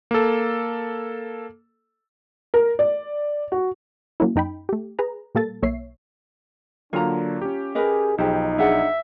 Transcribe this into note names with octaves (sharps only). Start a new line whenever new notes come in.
A#3 A4
A#4
D5
F#4
F#3 A#3 C#4 E4
F#2 D#4 G5 B5
A3 G4
G#4 B4 A#5
A#2 G3 A#3 A4 A6
B1 A#3 C#5 E5 C7
D3 F#3 A#3 D4 F4 A#5
C#4 G4
G#4 A#4 B4 D#5
B1 F3 D#4 G4 G#4 C5
D4 G#4 E5 F#5